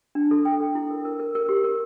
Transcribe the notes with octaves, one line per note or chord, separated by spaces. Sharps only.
D4
A4
G5
A4
E4
A#4
A#4
A#4
A#4
G4
A#4